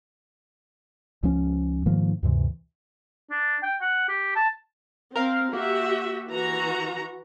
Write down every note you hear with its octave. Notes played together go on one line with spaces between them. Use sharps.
C#2 F3 C#4
G#2 D#3 F3 A#3
D2 G2 C3 E3
D4
G5
F#5
G4
A5
C4 A#4 F5
A#3 F#4 G4 E5
E3 F#4 A#5